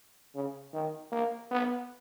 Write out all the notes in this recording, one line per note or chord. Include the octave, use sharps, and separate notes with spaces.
C#3
D#3
A#3
B3